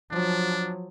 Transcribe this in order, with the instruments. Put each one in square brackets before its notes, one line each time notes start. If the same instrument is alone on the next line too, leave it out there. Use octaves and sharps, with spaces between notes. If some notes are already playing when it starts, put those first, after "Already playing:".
[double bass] F3 F#3 [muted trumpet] D4